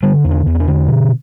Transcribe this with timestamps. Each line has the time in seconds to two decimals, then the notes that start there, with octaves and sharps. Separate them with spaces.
0.03 D3 G3
0.25 E2
0.31 D4
0.46 E2
0.55 C4
0.60 D4
0.67 D3
0.88 B2